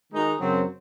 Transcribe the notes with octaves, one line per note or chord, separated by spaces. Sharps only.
D#3 G#3 D#4 F#4
F#2 C#3 F#3 C4